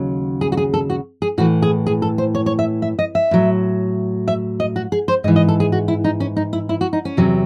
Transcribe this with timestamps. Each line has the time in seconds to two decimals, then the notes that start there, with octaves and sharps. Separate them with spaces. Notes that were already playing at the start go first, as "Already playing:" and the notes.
Already playing: D#2 C#3 F#3
0.41 G#4
0.52 F#4
0.57 G#4
0.74 A4
0.90 F#4
1.22 G#4
1.38 A2 E3 F#4
1.62 G#4
1.86 G#4
2.02 A4
2.18 C5
2.35 C#5
2.46 C#5
2.59 E5
2.82 E5
2.99 D#5
3.15 E5
3.31 A2 F#3
4.28 E5
4.60 D#5
4.76 F#4
4.92 G#4
5.08 C5
5.24 G#2 D#5
5.28 E3
5.36 D#5
5.48 A4
5.60 G#4
5.72 F#4
5.88 E4
6.04 D#4
6.20 C#4
6.37 D#4
6.53 E4
6.69 E4
6.81 F#4
6.93 D#4
7.05 C#4
7.17 E2 C3 F#3